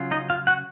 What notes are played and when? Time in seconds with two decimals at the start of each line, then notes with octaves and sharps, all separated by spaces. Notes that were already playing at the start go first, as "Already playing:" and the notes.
Already playing: C#3 F#3 C#4 F4
0.11 D#4 D#5
0.30 F4 F5
0.47 F#4 F#5